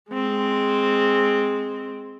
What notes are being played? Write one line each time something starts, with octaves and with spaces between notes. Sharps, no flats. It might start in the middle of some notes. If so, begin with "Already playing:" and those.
G#3 C4